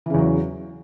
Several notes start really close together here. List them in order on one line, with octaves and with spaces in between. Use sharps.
E3 C#3 E2 F#3